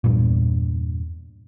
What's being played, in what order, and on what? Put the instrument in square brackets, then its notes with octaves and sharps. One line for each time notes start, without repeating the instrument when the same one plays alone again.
[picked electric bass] E2 G2 A#2